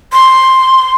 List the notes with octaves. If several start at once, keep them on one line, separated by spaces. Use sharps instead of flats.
C6